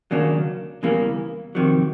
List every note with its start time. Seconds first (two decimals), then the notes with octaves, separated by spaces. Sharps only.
0.11 D#2 C#3 F#3 A#3 D4
0.83 E2 C#3 E3 G3 A#3
1.55 F2 C3 D#3 F#3